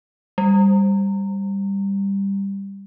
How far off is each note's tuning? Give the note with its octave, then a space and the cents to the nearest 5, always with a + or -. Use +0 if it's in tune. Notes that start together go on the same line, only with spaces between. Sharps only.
G3 +10